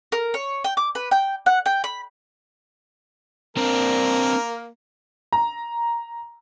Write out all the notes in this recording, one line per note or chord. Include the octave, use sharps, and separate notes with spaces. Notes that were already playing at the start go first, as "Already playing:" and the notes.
A#4
C#5
G5
D6
B4
G5
F#5
G5
B5
A#3 C4 D4 A#4
A#5